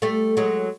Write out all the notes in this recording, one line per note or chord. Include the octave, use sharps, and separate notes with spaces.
G3 A3
F#3 G#3